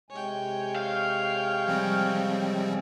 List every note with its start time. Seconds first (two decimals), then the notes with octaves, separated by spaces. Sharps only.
0.10 C3 G#3 C#5 G5 G#5
0.76 F5
1.68 F3 G3 C4